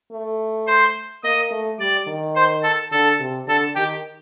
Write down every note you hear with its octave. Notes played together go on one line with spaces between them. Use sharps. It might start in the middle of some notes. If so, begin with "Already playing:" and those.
A3
C5
A#3 D#5
A3
G3 D5
D#3
C5
A4
D3 A4
C3
D3 A4
D#3 G4